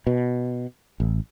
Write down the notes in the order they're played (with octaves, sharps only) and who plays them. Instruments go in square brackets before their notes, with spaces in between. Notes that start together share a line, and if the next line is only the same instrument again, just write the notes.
[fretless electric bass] B2
A1